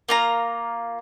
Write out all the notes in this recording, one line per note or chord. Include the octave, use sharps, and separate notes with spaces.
A#3 F4 A#5